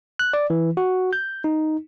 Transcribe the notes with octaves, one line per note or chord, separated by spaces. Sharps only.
F#6
D5
E3
F#4
G6
D#4